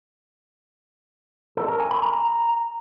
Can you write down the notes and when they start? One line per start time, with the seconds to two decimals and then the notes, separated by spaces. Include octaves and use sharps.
1.57 A4
1.68 A#4
1.80 G#5
1.91 B5
2.02 A#5